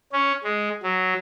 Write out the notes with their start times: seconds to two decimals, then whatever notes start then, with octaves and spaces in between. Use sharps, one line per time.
0.13 C#4
0.44 G#3
0.83 F#3